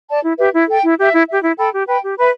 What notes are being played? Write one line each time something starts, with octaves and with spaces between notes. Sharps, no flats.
D5 A5
E4
G4 B4 E5
E4
A4 G5
E4
G4 E5
E4
G4 E5
E4
A4 G5 B5
G4
B4 G5 B5
G4
B4 E5 B5